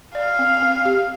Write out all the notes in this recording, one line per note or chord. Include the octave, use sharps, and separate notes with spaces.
D5 F5
C4
C4
G4